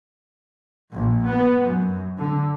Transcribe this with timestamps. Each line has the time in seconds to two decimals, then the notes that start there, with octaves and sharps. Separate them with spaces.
0.93 A#1
1.28 B3
1.62 F#2
2.17 D3